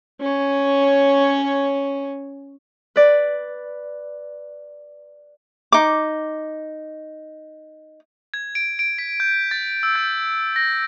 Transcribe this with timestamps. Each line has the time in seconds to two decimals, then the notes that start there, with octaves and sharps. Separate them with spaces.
0.21 C#4 C#5
2.96 B4 D5
5.72 D#4 D6
8.34 G#6
8.55 D7
8.79 D7
8.98 B6
9.20 G6
9.51 A6
9.83 E6
9.95 G6
10.56 A#6